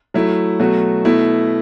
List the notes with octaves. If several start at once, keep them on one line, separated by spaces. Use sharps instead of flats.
F#3 A3 E4
B2 F#3 A3 F#4
B2 A3 E4